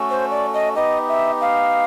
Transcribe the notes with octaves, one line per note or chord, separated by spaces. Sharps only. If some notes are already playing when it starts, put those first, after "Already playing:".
Already playing: A3 C#4 F#4 A4
C5
D5
D#5
B3 D#4 G4 D#5
E5
F5